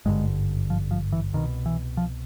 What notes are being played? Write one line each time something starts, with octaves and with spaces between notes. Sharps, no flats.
G#1 G2 D3 G#3
F3
F3
E3
C2 B2 D#3
E3
F3